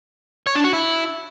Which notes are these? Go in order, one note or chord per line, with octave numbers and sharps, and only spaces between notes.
C#5
D4
F#4
E4